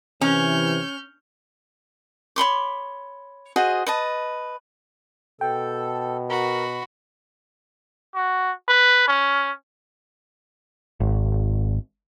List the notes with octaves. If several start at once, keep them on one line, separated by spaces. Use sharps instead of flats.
C3 E3 C#4 F6 G6
C#5 B5 C6 D6
F#4 G#4 C5 D#5
B4 D#5 A5
B2 A4 G5
F#4 A#4 B5
F#4
B4
C#4
G#1